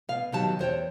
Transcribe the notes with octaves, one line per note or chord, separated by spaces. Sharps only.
B2 F5
B2 D#3 F#3 G4 A5
E2 C5 C#5 G5